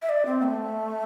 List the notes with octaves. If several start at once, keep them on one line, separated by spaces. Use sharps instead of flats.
E5
D5
C4
A3